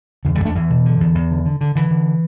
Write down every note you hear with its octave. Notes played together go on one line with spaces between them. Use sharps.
E2 D3
D3 G3
E2 A3 D4
E2 E3
B2
D3
E2
E2
D3
D3
D3
D3 E3
D3